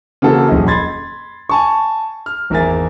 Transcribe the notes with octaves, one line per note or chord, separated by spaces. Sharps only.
C#3 E3 A#3 C4 F#4 A4
D#1 F2 C#4 G#4 D#5
B5 C6 G#6 A6
G#5 A5 C#6
F6
G#1 E2 A#4 E5 G#5 A6